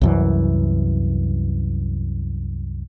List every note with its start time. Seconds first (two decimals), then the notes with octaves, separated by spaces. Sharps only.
0.02 C2 F#2 E3